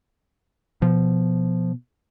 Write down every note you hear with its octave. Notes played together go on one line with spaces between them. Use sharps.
B2 F3